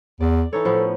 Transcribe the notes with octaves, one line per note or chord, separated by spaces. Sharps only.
E2 D5
E3 D#4 A4 C#5
A2 F3 B3